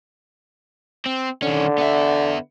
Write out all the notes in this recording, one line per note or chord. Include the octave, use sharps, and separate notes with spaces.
C4
D3 D#3 C#4
B3 E5